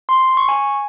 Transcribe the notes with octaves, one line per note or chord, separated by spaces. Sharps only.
C6
C#6
G#5